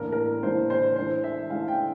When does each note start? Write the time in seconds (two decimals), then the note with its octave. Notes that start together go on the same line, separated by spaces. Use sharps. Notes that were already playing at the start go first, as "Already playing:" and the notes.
Already playing: A2 E3 A#3 D4 A#4
0.12 A#4
0.43 A2 E3 A#3 D4 C5
0.70 C5
0.96 E3 A3 D4 C5
1.24 E5
1.50 E3 A3 D4 F5
1.68 G5